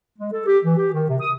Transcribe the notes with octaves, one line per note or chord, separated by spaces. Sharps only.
G#3
A4
G4
E3
G4
D#3
C3
D#6